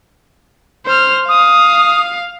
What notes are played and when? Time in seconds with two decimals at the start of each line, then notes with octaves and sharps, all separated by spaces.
0.86 C5 F6
1.29 F5 D#6